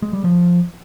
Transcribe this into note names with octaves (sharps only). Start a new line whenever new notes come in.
G#3
G3
F3